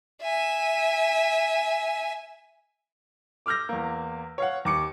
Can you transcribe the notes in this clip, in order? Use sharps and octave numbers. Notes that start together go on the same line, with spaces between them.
E5 G#5
D6 E6 F6 G6 A#6
E2 A#3
C#5 F5 F#5
D#2 D6 C#7